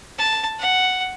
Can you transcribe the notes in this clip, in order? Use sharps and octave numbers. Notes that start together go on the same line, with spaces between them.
A5
F#5